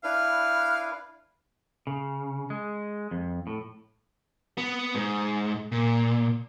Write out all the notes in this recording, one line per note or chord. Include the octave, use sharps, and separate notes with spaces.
D4 E4 B4 F5
C#3
G#3
F2
A2
B3
G#2
A#2